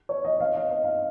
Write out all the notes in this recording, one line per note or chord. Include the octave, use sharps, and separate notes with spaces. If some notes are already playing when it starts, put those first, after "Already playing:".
C#5
D#5
F5
D#5
D#5
F5